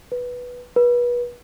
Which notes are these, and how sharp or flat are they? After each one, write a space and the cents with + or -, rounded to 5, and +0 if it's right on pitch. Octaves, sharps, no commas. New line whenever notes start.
B4 -5
B4 -30